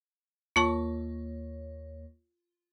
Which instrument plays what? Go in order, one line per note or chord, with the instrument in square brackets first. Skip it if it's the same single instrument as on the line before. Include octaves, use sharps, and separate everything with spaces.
[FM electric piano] D#2 A#3 C#5 [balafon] F4 A5 C#6